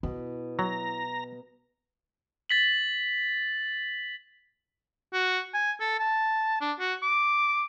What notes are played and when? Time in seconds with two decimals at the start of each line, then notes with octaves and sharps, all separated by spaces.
0.03 B2 E4
0.59 F#3 A#5
2.49 A6 B6 F#7
5.13 F#4
5.54 G#5
5.80 A4
5.99 A5
6.61 D4
6.79 F#4
7.02 D6